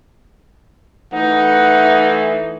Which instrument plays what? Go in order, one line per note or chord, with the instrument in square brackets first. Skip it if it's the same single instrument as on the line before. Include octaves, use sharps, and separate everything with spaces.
[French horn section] E3 A3 [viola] D#4 [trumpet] F#5